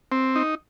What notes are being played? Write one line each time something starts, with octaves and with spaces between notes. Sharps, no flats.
C4
D#4